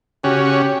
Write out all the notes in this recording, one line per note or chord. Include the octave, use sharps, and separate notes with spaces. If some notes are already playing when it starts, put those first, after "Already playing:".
C#3 C#4 F#4 G4